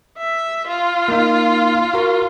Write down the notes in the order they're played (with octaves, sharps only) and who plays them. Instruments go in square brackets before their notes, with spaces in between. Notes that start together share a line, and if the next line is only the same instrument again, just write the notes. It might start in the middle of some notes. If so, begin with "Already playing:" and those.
[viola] E5
F4
[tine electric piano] A#3 D#4
F#4 A#4